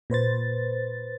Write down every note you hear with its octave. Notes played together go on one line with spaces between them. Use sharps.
A#2 B4 C5 A6